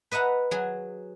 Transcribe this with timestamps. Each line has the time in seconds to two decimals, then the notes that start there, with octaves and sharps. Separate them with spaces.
0.11 B4 D#5 E5 F#5 A#5
0.51 F#3 G#4